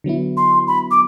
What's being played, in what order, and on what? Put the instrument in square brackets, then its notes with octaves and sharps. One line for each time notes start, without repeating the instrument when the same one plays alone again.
[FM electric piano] D3 F#3 B3 E4
[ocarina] C6
B5
D6